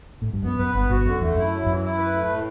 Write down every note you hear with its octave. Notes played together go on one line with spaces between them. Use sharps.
A2
G2
F#2 B3
F#2 B4
G1 G2 B3
G1 G2 F#4
F#2 D3
E2 A3
F#2 E4
F#3
F#2 E3
E4
B4
A3
A2